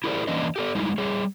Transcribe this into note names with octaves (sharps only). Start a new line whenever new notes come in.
E4 G4 G#4 A#4 C5 D5
E3 A#3 C#4 D4 B4 D#5
G4 A4 D5
G3 G#3 D#4 E4
G3 G#4 C#5